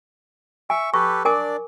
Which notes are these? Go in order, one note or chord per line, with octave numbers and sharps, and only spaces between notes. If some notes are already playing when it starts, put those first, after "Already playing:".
E5 G#5 C#6
G4 A4 B4 C#6
D4 A#4 D5 G#5 D6